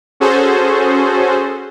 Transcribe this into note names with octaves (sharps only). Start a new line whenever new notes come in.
C#4 F#4 G#4 A4 C5